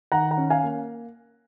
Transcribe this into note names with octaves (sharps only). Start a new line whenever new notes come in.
D#3 F#5 A#5
F#5 A#5
C#4
F5 G#5
A#3